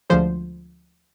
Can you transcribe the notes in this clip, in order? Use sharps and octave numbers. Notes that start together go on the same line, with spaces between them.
D2 D3 F3 G#3 C5